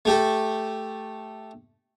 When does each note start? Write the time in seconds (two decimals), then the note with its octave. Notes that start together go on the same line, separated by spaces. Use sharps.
0.05 A3 G4 A4